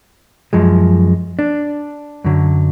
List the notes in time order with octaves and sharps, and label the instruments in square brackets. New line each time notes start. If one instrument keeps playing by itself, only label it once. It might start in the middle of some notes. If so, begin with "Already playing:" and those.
[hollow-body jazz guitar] F#2 F3 G#3
D4
F#2 D3 F#3